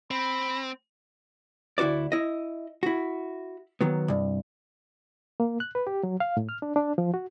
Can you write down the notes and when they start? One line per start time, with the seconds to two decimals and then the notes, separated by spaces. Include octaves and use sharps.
0.11 C4 B5
1.78 D2 E4 F#4 C5 D5
2.12 E4 D#5
2.83 E4 F#4
3.81 D#3 F#3 B3
4.08 C2 G2
5.40 A#3
5.60 F#6
5.75 B4
5.87 G4
6.03 F#3
6.20 F5
6.37 A2
6.49 F6
6.62 D4
6.76 D4
6.98 F3
7.14 F#4